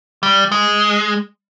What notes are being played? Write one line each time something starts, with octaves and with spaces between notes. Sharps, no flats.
G3
G#3